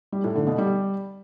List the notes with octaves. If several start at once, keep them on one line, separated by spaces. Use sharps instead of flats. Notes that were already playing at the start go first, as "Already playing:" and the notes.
G3
A2
D3
B2
G3